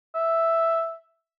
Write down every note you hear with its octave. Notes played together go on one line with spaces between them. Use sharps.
E5